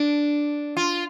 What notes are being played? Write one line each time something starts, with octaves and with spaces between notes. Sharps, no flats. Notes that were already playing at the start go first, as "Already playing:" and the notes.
Already playing: D4
F4